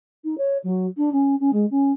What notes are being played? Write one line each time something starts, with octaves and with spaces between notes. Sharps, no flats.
D#4
C#5
F#3
D4
C#4
C#4
G#3
C#4